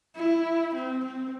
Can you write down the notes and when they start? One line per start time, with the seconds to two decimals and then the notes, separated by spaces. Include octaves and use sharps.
0.16 E4
0.74 C4
1.05 C4